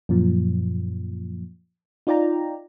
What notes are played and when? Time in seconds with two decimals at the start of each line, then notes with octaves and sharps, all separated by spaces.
0.09 F#2 A#2 F3
2.07 D#4 F4 D5 G5 A#5